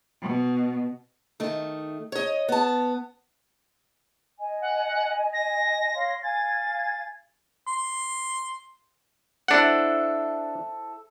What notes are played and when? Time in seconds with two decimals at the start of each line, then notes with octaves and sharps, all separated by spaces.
0.22 B2
1.40 D#3 A3
2.12 C#5 D#5
2.48 B3 A5
4.40 D#5 G#5
4.61 F#5
5.33 A#6
5.95 C#5 F5 C6
6.23 F5 G#5 G#6 A6
7.67 C6
9.48 D4 E4 A4 C5 F#5